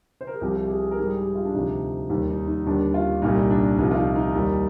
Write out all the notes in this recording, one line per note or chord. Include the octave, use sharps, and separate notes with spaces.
C5
A#4
G#4
C2 C3 F3 G4
G4
G#4
A#4
G#2 G3 G#4
G4
F4
D4
D2 C3 F3 D#4
D#2 D#3 G3 D#4
D#4
D#4
D#2 D3 G3 D4
F4
C2 A#2 G3 D#4
D4
C2 C3 F3 D#4
F4
D#4
D#4
D#2 D#3 G3